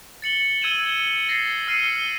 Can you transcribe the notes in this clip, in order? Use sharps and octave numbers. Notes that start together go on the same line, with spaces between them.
A6 C#7 F#7 G7
E6 G#6 D#7 E7 G7
A6 A#6 C7
E6 F6 C7 C#7 D#7